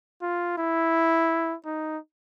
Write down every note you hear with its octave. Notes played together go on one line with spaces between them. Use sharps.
F4
E4
D#4